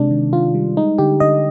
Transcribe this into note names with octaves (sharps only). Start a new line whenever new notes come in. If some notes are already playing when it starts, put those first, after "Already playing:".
Already playing: C3 G#3 D4
D#3
D#3 F4
G3
G#3 D#4
D3 G4
D3 D#5